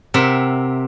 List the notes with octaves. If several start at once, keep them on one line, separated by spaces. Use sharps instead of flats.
C3 A#4 E5 F#5